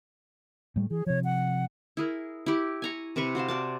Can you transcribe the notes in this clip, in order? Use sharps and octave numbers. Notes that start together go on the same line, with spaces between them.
A2 G3 A3
E3 G#4
C3 F3 C#5
F#5
E4 G#4 A#4
E4 G4
G#5 A#5 C#6
C3 C4 B4 C#6
F#4 C5 F5 A5
F#4 D5 A5